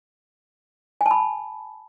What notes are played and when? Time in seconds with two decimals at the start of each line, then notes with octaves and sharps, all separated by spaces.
1.01 G#5
1.06 A5
1.11 B5